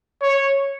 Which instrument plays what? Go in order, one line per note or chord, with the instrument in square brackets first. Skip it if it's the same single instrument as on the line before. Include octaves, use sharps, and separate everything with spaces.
[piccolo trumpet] C#5